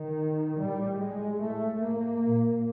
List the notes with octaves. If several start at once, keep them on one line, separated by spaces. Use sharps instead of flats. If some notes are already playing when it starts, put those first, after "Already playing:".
Already playing: D#3
A2 G3
G#3
A2 A3
A#3
A#2